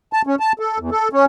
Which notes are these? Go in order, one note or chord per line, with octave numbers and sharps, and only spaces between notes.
A5
C#4
A5
A4
E2
A4
C#4